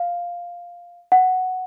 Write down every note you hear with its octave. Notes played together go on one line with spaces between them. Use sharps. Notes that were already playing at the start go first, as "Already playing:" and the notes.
Already playing: F5
F#5